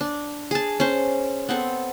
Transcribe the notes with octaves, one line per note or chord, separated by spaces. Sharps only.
D4
G#4 A5
C#4 C5
B3 C4 A4